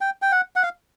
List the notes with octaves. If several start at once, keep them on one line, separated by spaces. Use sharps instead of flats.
G5
G5
F#5
F#5
F5